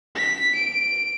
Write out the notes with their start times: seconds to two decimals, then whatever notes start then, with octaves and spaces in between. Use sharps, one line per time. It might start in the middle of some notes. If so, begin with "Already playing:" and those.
0.16 B6
0.55 D7